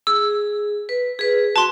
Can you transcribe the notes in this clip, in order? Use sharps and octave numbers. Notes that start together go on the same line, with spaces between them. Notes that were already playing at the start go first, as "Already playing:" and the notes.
G#4 E6
B4
G#4 B4
F#4 A5 C6